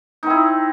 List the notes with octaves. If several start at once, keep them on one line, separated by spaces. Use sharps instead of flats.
C4 D#4 E4